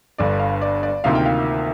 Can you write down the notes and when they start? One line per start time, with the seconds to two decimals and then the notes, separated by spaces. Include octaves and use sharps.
0.18 G1 G2 D3 D5
0.40 F5
0.62 D5
0.83 D5
1.04 D2 C3 D#3 A#3 F4 F5
1.15 G5
1.26 F5